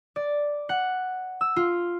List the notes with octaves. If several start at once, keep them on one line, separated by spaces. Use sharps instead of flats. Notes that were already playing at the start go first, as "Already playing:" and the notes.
D5
F#5
E6
F4